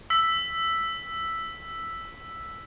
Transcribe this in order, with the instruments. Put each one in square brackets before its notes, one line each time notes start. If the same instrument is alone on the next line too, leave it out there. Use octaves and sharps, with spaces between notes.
[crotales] E6 B6